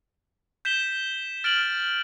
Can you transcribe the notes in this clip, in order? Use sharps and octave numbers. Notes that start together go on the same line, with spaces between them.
G6 B6 E7 G7
F6 A6 D7 F#7